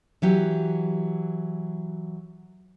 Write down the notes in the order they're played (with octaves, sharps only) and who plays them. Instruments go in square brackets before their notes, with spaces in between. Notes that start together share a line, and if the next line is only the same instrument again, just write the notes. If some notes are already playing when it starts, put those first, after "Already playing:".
[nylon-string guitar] E3 F#3 G4